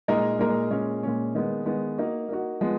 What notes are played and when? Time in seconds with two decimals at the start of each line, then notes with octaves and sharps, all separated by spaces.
0.08 A#2 G#3 D#4 A#4
0.39 A#2 G#3 D#4 A#4
0.71 A#2 G#3 C#4
1.03 A#2 G#3 C#4
1.35 D#3 G#3 B3
1.65 D#3 G#3 B3
1.97 A#3 D#4 F#4
2.29 A#3 D#4 F#4
2.61 F3 G#3 B3